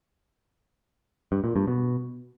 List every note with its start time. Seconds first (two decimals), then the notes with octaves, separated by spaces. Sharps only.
1.32 G2
1.44 A#2
1.56 G2
1.68 B2